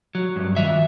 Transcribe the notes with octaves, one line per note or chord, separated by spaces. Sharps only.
F#3
G2
D#3 E5